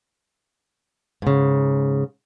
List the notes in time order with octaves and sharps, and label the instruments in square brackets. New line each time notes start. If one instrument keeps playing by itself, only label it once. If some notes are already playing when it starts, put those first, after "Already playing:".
[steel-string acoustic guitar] G#2 C#3